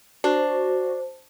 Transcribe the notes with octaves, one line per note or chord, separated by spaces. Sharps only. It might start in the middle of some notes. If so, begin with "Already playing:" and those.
D4 F#4 C5